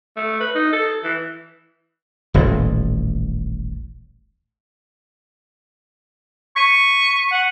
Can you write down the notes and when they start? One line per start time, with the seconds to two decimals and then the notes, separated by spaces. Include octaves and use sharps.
0.16 A3
0.41 B4
0.55 D#4
0.72 A4
1.04 E3
2.34 D#1 A1 A2
6.56 C#6 B6 C#7 D#7
7.32 F#5